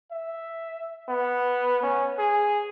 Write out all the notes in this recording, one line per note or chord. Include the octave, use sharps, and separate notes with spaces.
E5
B3
C#4
G#4